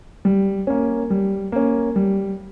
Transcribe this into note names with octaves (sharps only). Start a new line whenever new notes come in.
G3
A#3 C#4
G3
A#3 C#4
G3